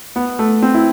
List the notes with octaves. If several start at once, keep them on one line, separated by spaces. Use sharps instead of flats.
B3
A3
C4
E4